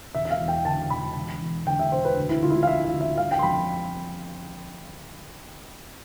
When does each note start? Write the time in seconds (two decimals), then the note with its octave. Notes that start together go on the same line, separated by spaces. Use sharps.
0.15 E1 E5
0.25 E5
0.31 F5
0.40 E2
0.48 G5
0.65 D3 A5
0.90 E1 B5
1.16 E1
1.41 E2
1.66 D3 G5
1.79 E5
1.92 E1 C5
2.05 B4
2.17 D2
2.29 E4
2.42 D3 F4
2.50 E4
2.55 F4
2.63 F5
2.67 F3 E5
2.84 E5
2.93 D2
3.01 E5
3.18 G1 F5
3.31 G5
3.39 C6
3.43 F2 B5